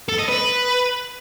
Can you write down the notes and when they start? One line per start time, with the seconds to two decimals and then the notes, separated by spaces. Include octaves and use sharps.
0.09 A4
0.19 D#5
0.29 B4